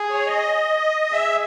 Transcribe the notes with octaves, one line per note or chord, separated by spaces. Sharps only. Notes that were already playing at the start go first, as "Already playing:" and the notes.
Already playing: G#4
C#5
D#5
G#4 E5